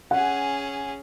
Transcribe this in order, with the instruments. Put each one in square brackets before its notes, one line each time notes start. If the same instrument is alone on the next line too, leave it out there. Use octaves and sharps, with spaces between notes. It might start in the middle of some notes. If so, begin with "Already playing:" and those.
[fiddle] C#4 G#4 [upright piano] F#5